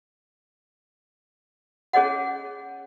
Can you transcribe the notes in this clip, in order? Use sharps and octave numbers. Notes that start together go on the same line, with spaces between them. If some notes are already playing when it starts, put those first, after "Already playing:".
C#4 G#4 C#5 D#5 F#5